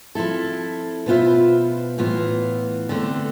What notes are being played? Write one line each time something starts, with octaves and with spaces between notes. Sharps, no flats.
F3 C4 E4 A4
B2 B3 F4 C5 E5
A2 E3 B3 F4
D3 A3 C4